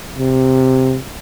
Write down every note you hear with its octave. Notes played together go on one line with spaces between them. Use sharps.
C3